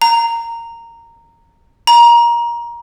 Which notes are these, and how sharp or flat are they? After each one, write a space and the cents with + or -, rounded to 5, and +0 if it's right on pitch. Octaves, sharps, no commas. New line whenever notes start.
A#5 -10
A#5 +20